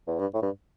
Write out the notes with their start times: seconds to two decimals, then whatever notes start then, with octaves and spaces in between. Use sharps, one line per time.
0.08 E2
0.19 G2
0.34 A2
0.43 G2